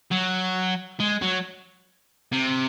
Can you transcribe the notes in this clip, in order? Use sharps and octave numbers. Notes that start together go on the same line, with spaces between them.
F#3
G#3
F#3
C3